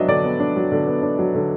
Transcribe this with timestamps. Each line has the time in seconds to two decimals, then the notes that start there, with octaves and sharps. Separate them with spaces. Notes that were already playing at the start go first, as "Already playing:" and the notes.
Already playing: F#3 B3 D4 D#5 E5
0.08 D3 D5
0.24 B3
0.40 D4
0.56 F#3
0.72 D3
0.87 B3
1.03 D4
1.19 F#3
1.35 D3